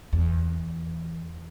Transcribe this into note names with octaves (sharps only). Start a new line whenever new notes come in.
E2